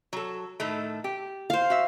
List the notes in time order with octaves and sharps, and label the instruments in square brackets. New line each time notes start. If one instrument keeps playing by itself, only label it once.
[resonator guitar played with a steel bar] F#3 A4
A2 D#3 A3
G4
[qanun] C5 F5
[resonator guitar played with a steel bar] F#4 E5